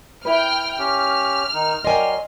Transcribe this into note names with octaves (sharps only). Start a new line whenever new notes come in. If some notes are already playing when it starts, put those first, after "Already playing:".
E4 B4 G5 F6
C#4 G4 F6
D#3 D#4
F#3 A#4 D5 D#5 G5 G#5 C6